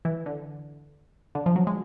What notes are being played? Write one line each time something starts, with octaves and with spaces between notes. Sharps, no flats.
E3
D3
D3
F3
F#3
G#3